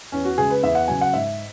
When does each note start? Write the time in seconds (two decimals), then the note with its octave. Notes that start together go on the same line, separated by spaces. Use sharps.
0.12 E2 C#4
0.25 F#4
0.38 C#3 G#3 G#4
0.50 B4
0.63 E2 E5
0.75 F#5
0.88 C#3 F#3 G#5
1.01 F#5
1.13 G#2 E5